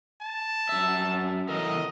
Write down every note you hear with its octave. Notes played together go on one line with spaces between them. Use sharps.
A5
F#2 E5
E3 A4 A#4 D#5